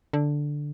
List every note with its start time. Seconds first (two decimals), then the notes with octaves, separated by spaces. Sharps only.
0.13 D3